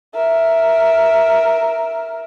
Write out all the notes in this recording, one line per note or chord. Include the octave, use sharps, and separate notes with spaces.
A#4 E5